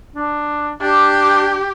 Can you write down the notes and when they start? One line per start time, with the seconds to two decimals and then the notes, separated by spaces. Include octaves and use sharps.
0.15 D4
0.81 D4 G4